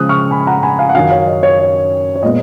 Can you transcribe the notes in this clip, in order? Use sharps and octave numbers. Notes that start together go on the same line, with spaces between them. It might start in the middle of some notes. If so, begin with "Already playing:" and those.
Already playing: C#3 F3 G#3 D#6 F#6
C#6 F6
G#5 B5
F#5 A#5
G#5 B5
F5 G#5
F#5
F#2 D#3 F#3 C#4 F5 G#5
C#5 F5
D#5
C#5 F5
C#5
C#5
A#2 G#3 B3 D#5